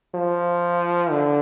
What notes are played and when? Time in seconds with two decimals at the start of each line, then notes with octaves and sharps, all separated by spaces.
0.14 F3
1.11 D3